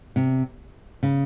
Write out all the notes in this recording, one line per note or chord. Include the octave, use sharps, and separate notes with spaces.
C3
C#3